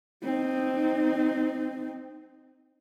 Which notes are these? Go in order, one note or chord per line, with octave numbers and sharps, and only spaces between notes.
C4 D#4